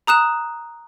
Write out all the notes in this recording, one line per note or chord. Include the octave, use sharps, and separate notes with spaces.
A#5 D#6 F#6 E7